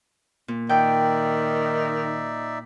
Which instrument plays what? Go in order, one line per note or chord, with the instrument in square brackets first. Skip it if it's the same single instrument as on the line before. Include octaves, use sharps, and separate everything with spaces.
[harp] A#2
[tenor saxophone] D#3 [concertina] D#4 D5 E5 [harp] G5